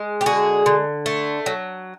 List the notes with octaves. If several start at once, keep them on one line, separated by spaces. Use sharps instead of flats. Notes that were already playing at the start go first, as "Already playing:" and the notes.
Already playing: G#3
G4
D3 F#4 G#4
D3
A3
F#3